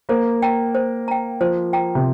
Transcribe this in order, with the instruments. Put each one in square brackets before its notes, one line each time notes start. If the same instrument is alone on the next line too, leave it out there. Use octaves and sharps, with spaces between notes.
[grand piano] A#3 [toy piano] C5
[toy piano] G5 A#5
C5
G5 A#5
[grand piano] F3 [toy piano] C5
[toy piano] G5 A#5
[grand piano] C3